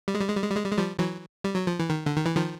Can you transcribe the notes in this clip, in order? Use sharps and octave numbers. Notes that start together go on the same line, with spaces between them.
G3
G#3
G3
G#3
G3
G#3
G3
G#3
G3
G#3
F3 G3
E3 F#3
G3
F#3
F3
E3
D#3
D3
D#3
E3
D#3 F3